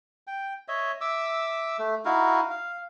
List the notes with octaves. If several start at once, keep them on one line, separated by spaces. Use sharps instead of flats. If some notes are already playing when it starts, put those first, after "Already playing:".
G5
C#5 D#5 E5
E5 D6 E6
A3
D#4 E4 F#4 F5
F5